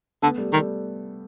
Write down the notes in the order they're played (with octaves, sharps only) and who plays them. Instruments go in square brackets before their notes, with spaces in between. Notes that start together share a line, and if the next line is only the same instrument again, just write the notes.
[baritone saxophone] D3 [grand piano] A3 B3
[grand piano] G3 A3
[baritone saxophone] D#3 [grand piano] G3 A3